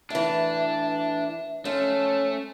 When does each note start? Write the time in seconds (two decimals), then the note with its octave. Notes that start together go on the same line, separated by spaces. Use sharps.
0.10 A2 E3 D4 E5
1.65 F3 A3 C#4